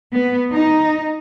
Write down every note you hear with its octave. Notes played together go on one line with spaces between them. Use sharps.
B3
D#4